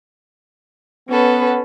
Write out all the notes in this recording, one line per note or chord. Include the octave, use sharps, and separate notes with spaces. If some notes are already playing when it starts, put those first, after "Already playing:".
B3 C#4 A4 B4